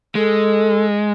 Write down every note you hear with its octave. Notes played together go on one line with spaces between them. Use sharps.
G#3 A4